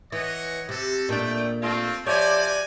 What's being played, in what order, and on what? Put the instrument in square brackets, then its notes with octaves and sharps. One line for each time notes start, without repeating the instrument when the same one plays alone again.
[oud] E3 [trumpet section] C#5 D#5 F#5
[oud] C3 [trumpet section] F#4 G4 A4
[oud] A#2 D4 [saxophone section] A3 [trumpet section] D5 G5
[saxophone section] A3 F4 [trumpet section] C4
[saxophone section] F3 G4 E5 [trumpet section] F#4 G#5 [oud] C#5 [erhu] D5